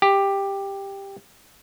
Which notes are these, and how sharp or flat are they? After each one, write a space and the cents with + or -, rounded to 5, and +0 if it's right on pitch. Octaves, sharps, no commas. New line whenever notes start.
G4 +10